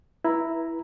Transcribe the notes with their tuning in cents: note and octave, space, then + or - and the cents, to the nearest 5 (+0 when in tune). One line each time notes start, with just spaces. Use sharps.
E4 +0 B4 -25 A#5 +0